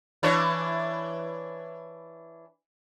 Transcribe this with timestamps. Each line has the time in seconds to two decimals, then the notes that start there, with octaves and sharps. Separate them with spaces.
0.23 E3 D4 C#5